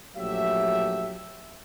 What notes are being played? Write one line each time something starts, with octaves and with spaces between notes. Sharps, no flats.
A#1 F#3 A3 G4 E5